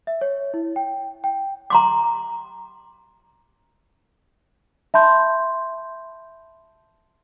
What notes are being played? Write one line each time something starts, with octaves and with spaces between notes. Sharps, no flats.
E5
C#5
E4
G5
G5
A#5 C6 D6
E5 A5 B5 C6 G6